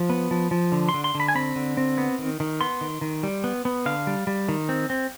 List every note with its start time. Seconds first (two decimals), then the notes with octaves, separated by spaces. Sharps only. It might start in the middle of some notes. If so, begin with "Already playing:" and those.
Already playing: F3
0.10 B3
0.31 F3
0.51 F3
0.72 D3
0.89 C6
0.94 D3
1.04 C6
1.15 D3
1.20 B5
1.28 G#5
1.35 C4 B5
1.56 D3
1.77 C4
1.98 B3
2.18 D#3
2.40 D#3
2.61 B3 C6
2.81 D#3
3.01 D#3
3.23 G3
3.44 B3
3.65 B3
3.86 D3 F5
4.07 G3
4.27 G3
4.49 D#3
4.69 C4
4.90 C4